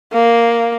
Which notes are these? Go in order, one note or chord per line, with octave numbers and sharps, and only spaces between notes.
A#3